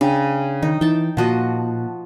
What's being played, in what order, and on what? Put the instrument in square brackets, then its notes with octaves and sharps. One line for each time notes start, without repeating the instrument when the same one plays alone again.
[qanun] C#3 [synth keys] D4 G5 D#7
[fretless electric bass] D#3 [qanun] D#4
[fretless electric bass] E3 [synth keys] D#4 [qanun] G5 A5
[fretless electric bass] A#2 [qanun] F3 F#4 D#5 [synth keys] F#5 A5